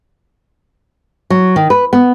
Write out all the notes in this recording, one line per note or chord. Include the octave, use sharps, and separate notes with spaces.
F#3
D#3
B4
B3